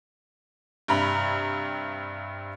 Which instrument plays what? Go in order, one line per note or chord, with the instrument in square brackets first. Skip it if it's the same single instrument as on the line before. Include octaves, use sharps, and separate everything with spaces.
[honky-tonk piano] G2 C3 A#5 B5